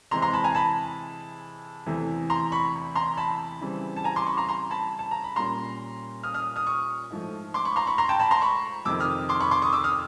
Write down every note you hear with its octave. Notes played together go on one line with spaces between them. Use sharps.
C3 E3 G#3 C4 A#5 C6
A#5 C6
A5 B5
G#5 A#5
A5 B5
E2 C3 E3 A3
A#5 C6
B5 C#6
A#5 C6
A5 B5
C#3 E3 G3 C4
A5
G#5 A#5
C6 D6
B5 C#6
A#5 C6
A#5 C6
A5 B5
A5
A#5
B5
A#2 G3 A#3 C#4 A#5 C6
D#6 F6
D#6 F6
D#6 F6
C#6 D#6
G#2 F3 A3
C6 D6
B5 C#6
A#5 C6
B5 C#6
A#5 C6
G5 A5
A5 B5
A#5 C6
B5 C#6
F2 C3 D#3 D6 E6
D#6 F6
C6 D6
B5 C#6
C6 D6
C#6 D#6
D6 E6
D#6 F6